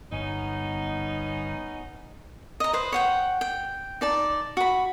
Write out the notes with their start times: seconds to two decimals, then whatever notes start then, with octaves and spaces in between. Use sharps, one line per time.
0.12 G1 B3 C#4 D#4
2.60 D#5 A#5
2.73 B4 C5
2.92 C#5 F#5 G5
3.41 G5
4.01 D#4 D5 A5
4.57 F#4 B5